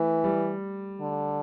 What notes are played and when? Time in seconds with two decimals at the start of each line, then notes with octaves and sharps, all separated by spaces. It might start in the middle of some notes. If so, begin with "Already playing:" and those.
Already playing: E3 A3
0.24 G3
1.01 D3